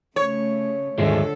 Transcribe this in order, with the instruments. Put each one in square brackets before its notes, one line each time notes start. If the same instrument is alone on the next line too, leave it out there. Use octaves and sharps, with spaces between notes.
[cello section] C#3 A3 [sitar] C#5
[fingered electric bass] D#1 G#2 D#3 [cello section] D3 A4 [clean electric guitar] F3 G#3 A3